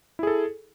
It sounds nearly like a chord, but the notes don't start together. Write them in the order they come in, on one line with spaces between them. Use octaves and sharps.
E4 G#4 A4